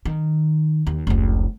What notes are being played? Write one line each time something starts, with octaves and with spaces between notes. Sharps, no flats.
D#3
D#2
F1 C#2